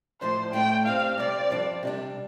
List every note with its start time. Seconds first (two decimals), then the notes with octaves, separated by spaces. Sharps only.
0.21 A2 F3 D4 C5
0.53 A2 A3 D4 G5
0.86 G2 G3 C4 F5
1.18 C3 G3 C4 D5
1.50 G2 F3 D4
1.83 C3 G3 D4